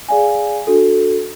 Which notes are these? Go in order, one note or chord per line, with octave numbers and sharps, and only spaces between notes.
G#4 D5 F5 G#5
D4 F#4 A4